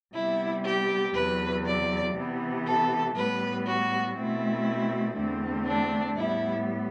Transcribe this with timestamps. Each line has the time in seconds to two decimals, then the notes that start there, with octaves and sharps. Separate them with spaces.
0.15 C3 G3 B3 E4
0.65 G4
1.16 E2 C3 F#3 B4
1.65 D5
2.16 C3 E3 B3
2.67 A4
3.16 A2 G3 B3 B4
3.67 F#4
4.16 B2 A3 C4 E4
5.16 E2 D3 A3 C4
5.67 D4
6.17 A2 G3 B3 E4